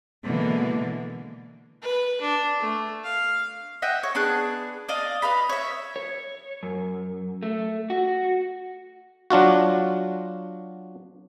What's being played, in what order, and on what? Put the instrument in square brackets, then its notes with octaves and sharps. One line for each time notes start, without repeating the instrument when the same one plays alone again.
[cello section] B2 D3 E3 G#3 A#3
[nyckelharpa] B4
D4
A3
F5
[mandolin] D#5 E5 F#5 G5
C#5
B3 D4 G#4 F#6
D5 D#5 F5
D#4 B4 F5 B5
C#5 E5
[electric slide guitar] C#5
F#2
A3
F#4
[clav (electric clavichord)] F#3 D4 F4 F#4